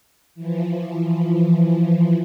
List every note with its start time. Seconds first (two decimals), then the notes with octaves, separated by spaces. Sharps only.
0.35 E3 F3